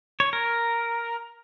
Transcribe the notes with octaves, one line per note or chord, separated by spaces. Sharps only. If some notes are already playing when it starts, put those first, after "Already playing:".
C#5
A#4